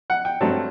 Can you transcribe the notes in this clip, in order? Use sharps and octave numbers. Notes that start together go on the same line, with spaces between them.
F#5
G5
G2 F#3 A3 C4 A5